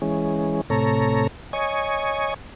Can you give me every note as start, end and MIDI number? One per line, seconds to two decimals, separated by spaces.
0.02 0.61 52
0.02 0.61 56
0.02 0.61 61
0.70 1.27 45
0.70 1.27 48
0.70 1.27 69
0.70 1.27 73
0.70 1.27 82
1.53 2.34 73
1.53 2.34 75
1.53 2.34 80
1.53 2.34 85